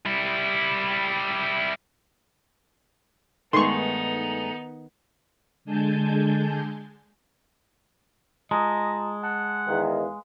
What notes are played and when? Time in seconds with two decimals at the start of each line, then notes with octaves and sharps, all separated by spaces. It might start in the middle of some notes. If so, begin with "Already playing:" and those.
0.06 G3 E4
3.53 G2 D#3 G#3 A3 B3 D#4 C6 C#6
5.65 D3 G#3 G#5 A5 G6
8.51 G#3 F4 D#5 A5 A#5
9.24 F#5 A5
9.67 E2 D#3 B4 F5